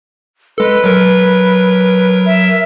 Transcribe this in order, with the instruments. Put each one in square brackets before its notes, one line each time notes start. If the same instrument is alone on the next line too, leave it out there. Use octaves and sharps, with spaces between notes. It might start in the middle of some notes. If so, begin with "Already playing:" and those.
[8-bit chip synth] G#3 A4 [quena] B4
[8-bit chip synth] F#3 A#4
[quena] E5